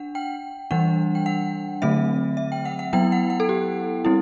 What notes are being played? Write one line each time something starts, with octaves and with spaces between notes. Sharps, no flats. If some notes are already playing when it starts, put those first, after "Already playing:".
Already playing: D4 F#5
G5
E3 G3 D4 F#5
G5
F#5
D3 F#3 A3 C4 E5
E5
G5
F#5
F#5
F#3 B3 E4 G5
F#5
F#5
A4
G4
G3 C4 E4